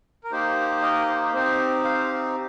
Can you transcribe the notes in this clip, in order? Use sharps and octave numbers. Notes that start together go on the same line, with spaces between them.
A#4
A#3 D#4 G4 C5
A#4 D#5
C5
C4 D#4 G4 C5
C5 F5